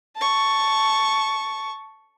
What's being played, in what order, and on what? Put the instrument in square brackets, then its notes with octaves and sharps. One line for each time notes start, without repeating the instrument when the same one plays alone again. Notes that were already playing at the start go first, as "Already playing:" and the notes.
[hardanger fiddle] A5 C#6